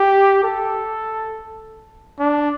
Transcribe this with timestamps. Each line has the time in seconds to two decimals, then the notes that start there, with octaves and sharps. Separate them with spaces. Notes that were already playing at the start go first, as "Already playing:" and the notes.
Already playing: G4
0.43 A4
2.19 D4